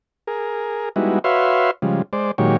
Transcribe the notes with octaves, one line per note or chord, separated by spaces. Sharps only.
G#4 A#4
G3 G#3 B3 D#4 E4 F#4
F#4 B4 C#5 E5 F5 C6
C#3 F3 G3 G#3
G#3 C5 D5
A#2 D#3 F#3 G#3 G4 C#5